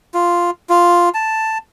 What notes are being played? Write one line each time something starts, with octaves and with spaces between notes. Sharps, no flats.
F4
F4
A5